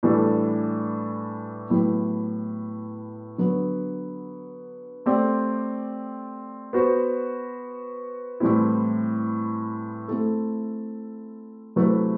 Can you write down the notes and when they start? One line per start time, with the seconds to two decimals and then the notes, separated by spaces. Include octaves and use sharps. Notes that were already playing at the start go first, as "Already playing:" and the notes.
0.03 A2 E3 G3 D4 A4
1.70 A2 F#3 B3 E4 G4
3.38 D3 F#3 B3
5.06 A3 C4 G4 D5
6.73 B3 F#4 C5
8.40 A2 E3 G3 C4 E4
10.08 A3 C4 E4 A4
11.76 C3 F#3 A3 E4 B4